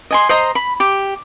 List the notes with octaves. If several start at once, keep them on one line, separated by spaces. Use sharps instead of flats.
D#5 G#5 C6
C5 D#5 A#5 C6
B5
G4